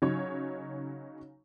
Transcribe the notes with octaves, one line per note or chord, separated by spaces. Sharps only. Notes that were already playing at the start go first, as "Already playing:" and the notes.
C#3 F#3 D#4 C#5